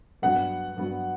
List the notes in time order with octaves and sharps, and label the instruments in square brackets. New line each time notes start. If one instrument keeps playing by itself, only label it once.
[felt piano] G2 F#3 B3 [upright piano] F#5
[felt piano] G2 F#3 B3